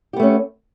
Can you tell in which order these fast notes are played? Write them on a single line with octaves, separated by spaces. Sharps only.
G4 B3 A3 C#4